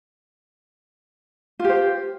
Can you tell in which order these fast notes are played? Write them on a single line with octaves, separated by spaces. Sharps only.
F4 G4 C5